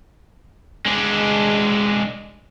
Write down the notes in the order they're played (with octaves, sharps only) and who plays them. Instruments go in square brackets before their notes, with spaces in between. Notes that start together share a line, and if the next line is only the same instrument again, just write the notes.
[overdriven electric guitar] G#3 D4